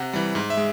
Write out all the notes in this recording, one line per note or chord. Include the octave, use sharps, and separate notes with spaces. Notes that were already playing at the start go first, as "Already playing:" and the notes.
Already playing: C3 F#5
E3 G3
G#2
E5
G#3